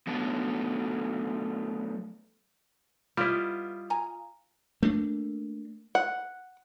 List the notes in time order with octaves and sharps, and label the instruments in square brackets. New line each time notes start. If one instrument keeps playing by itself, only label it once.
[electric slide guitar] F#3 A3 B3 D4 A4
[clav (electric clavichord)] G3 E4 [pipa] B3 [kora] F4 D#5
[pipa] G#5 A#5
[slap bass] A3 A#3 D4
[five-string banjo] F#5